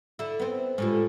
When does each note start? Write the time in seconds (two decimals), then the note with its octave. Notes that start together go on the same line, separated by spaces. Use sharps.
0.19 D3 E4
0.40 B3 C4
0.78 A2 D3 G3 G#3 F4